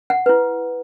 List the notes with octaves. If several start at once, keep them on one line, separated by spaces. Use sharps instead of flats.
F#5
E4 B4